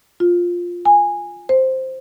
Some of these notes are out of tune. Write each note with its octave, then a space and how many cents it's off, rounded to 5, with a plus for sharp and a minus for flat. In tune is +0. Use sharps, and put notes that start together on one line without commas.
F4 +5
G#5 -15
C5 +0